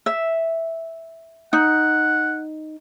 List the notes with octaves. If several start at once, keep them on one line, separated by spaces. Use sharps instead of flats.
E5
D#4 F#5